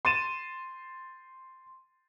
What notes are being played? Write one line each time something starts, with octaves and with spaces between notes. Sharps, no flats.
C6 A6 D#7 E7